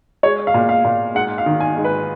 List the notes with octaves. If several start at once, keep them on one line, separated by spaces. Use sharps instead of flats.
G#3 C#5
F5
A#2
F5
A#2
G#2 F#5
F5
D#3
G#5
G#2
B4